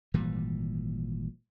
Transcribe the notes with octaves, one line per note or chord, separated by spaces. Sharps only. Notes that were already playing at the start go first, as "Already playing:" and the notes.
G#1 A#2 E3 G3